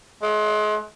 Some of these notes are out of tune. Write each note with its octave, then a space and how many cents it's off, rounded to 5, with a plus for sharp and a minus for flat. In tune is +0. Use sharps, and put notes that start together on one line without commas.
G#3 +35